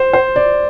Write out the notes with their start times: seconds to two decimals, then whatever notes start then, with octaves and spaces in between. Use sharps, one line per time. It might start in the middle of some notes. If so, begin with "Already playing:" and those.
Already playing: C5
0.13 C5
0.36 D5